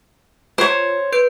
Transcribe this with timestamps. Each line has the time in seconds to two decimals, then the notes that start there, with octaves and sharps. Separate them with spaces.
0.58 F4 C5 C#5
1.12 B4 G6 D7